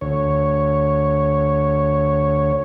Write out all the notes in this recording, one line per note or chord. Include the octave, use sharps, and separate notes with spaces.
D2 C#5